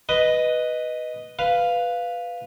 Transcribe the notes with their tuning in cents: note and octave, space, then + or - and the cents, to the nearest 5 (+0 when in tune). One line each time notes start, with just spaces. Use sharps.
B4 +0 D#5 +0
B4 +0 F5 +0